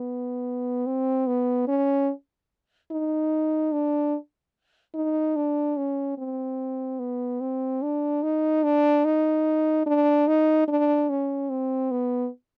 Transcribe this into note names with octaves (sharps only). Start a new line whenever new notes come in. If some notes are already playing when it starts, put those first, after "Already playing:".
Already playing: B3
C4
B3
C#4
D#4
D4
D#4
D4
C#4
C4
B3
C4
D4
D#4
D4
D#4
D4
D#4
D4
C#4
C4
B3